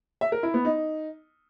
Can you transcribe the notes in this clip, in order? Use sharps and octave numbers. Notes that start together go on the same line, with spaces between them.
E5
A#4
E4
B3
D#4